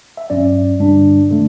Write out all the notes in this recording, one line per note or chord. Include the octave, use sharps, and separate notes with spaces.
E5
G2 F#3 C#4 D5
G2 D3 G3 D4
D3 A3